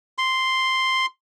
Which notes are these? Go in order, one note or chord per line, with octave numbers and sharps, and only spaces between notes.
C6